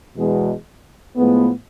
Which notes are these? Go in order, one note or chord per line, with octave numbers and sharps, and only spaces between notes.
E2 B2 G#3
A2 F3 G#3 B3